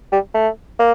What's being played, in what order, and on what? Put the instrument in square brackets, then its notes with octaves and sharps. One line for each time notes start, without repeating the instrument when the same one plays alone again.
[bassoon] G3
A3
A#3